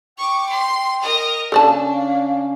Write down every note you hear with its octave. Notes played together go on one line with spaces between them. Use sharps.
G5 C#6 D6
C6
A#4 D#5
C#3 C#4 D4 A4 D5 F5 A5